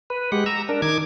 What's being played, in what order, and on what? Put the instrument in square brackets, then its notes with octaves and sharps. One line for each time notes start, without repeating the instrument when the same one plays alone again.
[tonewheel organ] B4
G#3 G4 F#5
A#5 E6
D4 A#4
D#3 D6 G#6